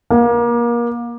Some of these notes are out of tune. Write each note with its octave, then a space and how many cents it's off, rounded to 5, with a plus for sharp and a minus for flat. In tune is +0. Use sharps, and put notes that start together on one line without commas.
A#3 +30